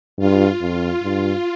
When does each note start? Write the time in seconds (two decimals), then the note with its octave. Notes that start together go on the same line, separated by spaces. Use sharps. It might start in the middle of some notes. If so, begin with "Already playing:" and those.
0.19 G2 F4
0.61 F2 F4
1.03 G2